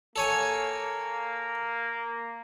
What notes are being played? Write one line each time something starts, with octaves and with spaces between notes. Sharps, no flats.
A#3 A4 C#5 G#5